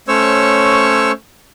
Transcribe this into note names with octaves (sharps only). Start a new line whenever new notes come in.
A3 C#4 C5 C#5 C#6 E6